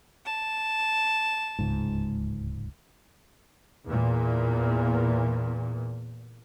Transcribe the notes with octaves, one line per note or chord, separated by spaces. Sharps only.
A5
D1 C#2 G#2
E2 A#2